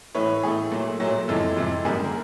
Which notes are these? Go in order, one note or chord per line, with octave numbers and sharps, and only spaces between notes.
A2 E3 A3 B4 C#5
A2 E3 A3 G#4
A#2 F#3 A3
A#2 F#3 A3
F2 C3 E3 G#3 A4
F2 C3 E3 G#3
F#2 D3 G3 A#3 G#4
A#4